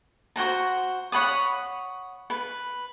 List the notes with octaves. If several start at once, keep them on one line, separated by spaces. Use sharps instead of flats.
F#4 C5 F#5 A#5
C#5 F#5 B5 D#6
B4